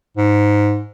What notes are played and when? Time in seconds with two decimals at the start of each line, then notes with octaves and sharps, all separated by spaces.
0.17 G#2